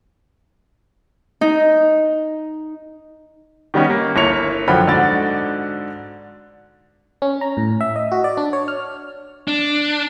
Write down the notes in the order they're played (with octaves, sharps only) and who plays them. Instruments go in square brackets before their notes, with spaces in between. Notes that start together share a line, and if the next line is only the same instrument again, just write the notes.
[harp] D#4
[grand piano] D#3 G3 B3 C#4 D#4
A#3
G1 A#3 E4 C#5 C#7 F7
A#1 F#2 D3 F3 G5 B5
G#2 D3 D4 F#4 D5 A6
[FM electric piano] C#4
A#5
A2
E5
D#5
F#4
D5
D4
C#5
F6
[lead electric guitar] D4